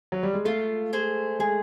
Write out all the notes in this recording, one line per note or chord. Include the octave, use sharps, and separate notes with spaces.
F#3
G3
G#3
A3 F4
G#4 C5
G#3 G#4